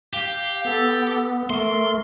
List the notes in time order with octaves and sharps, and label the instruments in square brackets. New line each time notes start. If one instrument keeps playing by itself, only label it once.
[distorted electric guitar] G4 [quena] F5
[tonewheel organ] B3 [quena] A4
[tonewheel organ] A3 [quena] A#4 [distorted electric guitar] C6